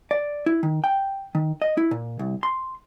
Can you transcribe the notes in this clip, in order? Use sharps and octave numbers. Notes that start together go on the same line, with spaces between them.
D5
E4
D#3
G5
D#3
D#5
E4
A#2
C2
C6